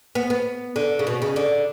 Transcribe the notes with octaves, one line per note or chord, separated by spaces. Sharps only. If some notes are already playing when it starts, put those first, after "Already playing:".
B3
B3
D3
C#3
B2
C#3
D3